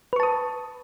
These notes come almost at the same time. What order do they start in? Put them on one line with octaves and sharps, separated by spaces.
B4 C#6 A5 D#6